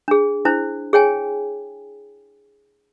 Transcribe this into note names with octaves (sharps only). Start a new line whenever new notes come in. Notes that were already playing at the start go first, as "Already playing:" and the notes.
D4 G#4
D4 E4 C5
G#4 C#5 G5 G#5